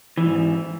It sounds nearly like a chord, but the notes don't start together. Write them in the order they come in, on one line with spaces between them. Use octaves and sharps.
E3 F2 G#2